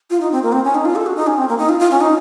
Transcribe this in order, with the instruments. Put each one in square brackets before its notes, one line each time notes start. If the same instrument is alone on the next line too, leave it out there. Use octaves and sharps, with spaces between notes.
[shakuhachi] F4
D#4
C4
A#3
C4
C#4
D#4
F4
A4
F#4
D#4
C#4
C4
A#3
D#4
F4
F4
C#4
D#4